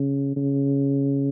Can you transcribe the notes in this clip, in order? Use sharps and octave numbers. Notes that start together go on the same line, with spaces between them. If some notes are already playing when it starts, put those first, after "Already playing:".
Already playing: C#3
C#3